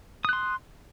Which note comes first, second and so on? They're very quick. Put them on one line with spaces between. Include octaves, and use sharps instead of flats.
D#6 F#6 C6